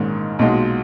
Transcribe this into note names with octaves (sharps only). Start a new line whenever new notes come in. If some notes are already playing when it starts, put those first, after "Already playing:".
Already playing: A#1 G#2 D#3 G#3 C#4
B1 A#2 G#3 D#4 F#4